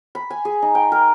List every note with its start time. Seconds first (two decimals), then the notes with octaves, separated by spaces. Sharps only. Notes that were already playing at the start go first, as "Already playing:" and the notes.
0.15 B5
0.30 G#5
0.45 G#4
0.62 D#4
0.75 G5
0.92 A#4